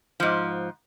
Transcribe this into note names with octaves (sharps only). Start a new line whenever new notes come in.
G#2 F3